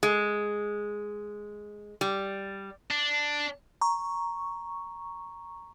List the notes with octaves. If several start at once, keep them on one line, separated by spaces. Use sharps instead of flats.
G#3
G3
D4
A#5 C#6